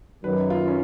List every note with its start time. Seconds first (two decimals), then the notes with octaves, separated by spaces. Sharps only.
0.24 F#2 D#3 F#3 B4
0.50 F4
0.68 C#4